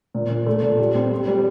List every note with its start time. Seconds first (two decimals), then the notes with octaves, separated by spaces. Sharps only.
0.14 A#2
0.30 A#2
0.46 A3
0.63 A#2
0.79 G3
0.95 C4
1.11 G3
1.28 G3